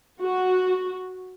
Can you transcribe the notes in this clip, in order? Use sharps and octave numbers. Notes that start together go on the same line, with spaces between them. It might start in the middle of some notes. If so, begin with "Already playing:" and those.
F#4